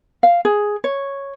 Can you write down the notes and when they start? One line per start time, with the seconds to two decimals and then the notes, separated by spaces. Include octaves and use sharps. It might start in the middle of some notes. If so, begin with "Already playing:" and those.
0.23 F5
0.45 G#4
0.84 C#5